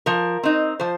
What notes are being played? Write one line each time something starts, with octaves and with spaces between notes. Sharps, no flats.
F3 A#4
C4 D#4
F3 C5